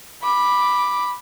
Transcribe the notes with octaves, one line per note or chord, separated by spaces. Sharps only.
B5 D6